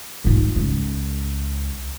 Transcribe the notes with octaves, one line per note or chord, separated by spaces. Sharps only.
G#2 F4
C#2